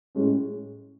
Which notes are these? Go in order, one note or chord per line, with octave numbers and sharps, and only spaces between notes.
A2 G#3 C#4